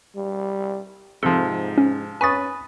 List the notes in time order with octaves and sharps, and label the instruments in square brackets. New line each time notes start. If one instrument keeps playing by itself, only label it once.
[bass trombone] G3
[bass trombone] G#2 [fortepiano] C3 F3 [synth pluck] A4
[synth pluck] C#4
[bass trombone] C#4 [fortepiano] B4 C#6 D#6 [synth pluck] G#5 A6